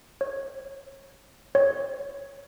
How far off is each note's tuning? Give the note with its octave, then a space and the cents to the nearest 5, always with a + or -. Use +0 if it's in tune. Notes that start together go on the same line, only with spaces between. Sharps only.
C#5 -25
C#5 -5